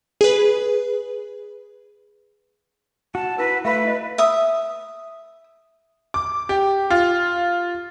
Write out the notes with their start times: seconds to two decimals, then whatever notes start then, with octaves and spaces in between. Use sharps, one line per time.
0.21 G#4 B4
3.15 F#4 A5
3.38 E4 A#4 B4
3.65 A3 B4 E5 F5 B5
3.84 E4 D#5
4.18 E5 D#6
6.14 D6
6.49 G4
6.90 F4